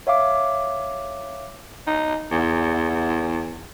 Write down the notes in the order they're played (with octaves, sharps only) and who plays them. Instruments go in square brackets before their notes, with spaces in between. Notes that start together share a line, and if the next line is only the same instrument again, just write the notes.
[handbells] C#5 E5 F5 D6
[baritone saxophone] D#4
E2